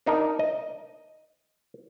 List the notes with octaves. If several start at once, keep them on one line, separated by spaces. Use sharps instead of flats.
D4 D#4 A#4
D#5